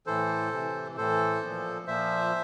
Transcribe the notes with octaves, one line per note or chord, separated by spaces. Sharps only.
A2 E3 A4 C5
C3 E3
A2 E3 A4 C5
A#2 F3
A#2 F3 C5 E5